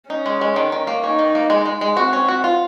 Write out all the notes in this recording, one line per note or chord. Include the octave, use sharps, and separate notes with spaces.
C#4 D#4
G#3
G#3
D#3
D#3
A#3
C#4 D#4
D#3
A#3
G#3
G#3
G#3
C4 F#4
C#4
F#4
F4